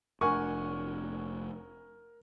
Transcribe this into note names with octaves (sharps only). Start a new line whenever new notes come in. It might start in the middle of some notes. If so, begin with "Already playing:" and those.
F1 A3 D4 A#4 F#5 G#5 C#6